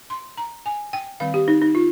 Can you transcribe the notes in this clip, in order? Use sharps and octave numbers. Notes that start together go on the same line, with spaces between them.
C6
A#5
G#5
G5
D#3 G3 C4 F5
G4
D#4
D#4
F4